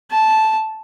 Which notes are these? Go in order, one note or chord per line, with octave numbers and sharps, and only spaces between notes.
A5